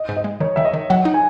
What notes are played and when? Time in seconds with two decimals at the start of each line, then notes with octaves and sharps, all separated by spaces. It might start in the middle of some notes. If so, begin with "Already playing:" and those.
Already playing: D#5
0.09 G#2
0.17 D#5
0.24 G#3
0.40 D#3 C#5
0.56 D#3 E5
0.65 D#5
0.73 D#3
0.90 F#3 F#5
1.05 D#4
1.14 G#5